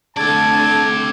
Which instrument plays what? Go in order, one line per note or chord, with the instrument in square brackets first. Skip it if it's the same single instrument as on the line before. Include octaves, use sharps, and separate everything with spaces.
[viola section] D3 A3 [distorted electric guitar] C4 D5 [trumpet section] A5 [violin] G#6